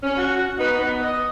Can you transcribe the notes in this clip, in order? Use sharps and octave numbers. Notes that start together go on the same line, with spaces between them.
C#4
F#4
B3 D#4 F#4 B4
B3
D#5